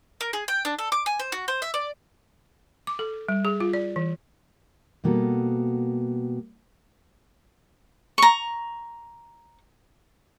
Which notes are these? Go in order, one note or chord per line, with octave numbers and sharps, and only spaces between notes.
A#4
G#4
G5
D4
A4
D6
G#5
C5
F#4
C5
E5
D5
D6
A4
G3
G#4
F4
D5
E3
B2 G3 A#3 B3 F#4 A4
A#5 C#6